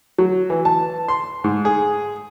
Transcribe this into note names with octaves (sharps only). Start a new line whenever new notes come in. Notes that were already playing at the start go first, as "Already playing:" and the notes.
F#3
E3
A5
C6
G#2
G#4